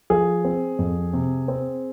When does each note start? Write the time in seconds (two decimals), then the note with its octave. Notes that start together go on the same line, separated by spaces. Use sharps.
0.10 F3 G#4
0.45 C4
0.79 F2
1.13 C3
1.48 C4